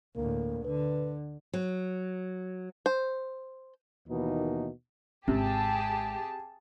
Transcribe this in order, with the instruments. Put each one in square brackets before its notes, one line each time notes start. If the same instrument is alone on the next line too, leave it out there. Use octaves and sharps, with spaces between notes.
[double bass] D2 A2 [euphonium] A#3
[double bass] D3 [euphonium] B4
[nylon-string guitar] F#3
[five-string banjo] C5
[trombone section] D#2 B2 E3 A#3 D#4
[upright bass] G#1 [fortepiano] C3 [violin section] G4 G#4 A5